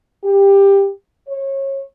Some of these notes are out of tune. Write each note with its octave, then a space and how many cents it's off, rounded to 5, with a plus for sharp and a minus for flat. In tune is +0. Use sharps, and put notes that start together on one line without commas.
G4 +15
C#5 -25